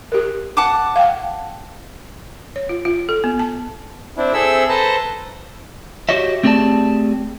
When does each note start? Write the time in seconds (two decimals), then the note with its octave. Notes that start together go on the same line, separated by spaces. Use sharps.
0.12 G4 A#4
0.57 F#5 A5 D6
0.96 F5 G5
2.56 C#5
2.69 F4
2.85 F4
3.09 A4
3.24 B3
3.39 A5
4.17 C4 D4 E4
4.34 C4 G#4 A4 E5 E6
4.69 A4 B4 C5 A5 A#5
6.09 F#4 G4 C#5 D#5 E5
6.43 A3 C4 G4 G#4 D5 A5